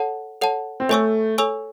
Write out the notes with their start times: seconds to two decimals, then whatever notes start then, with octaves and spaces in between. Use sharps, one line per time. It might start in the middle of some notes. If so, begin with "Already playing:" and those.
Already playing: A4 C#5 F#5 A5
0.41 A4 C#5 F#5 A5
0.80 C4
0.89 A3 A4 C#5 G#5 C#6 E6
1.38 A4 C#5 G#5 C#6 E6